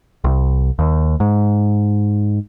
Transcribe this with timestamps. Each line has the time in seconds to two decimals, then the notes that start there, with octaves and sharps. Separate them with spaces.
0.24 C2
0.79 D#2
1.20 G#2